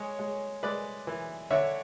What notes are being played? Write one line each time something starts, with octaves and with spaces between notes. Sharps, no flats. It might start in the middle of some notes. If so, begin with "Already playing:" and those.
Already playing: G#3 C#5
G#3
G#3 B4 D5
E3
D3 C#5 E5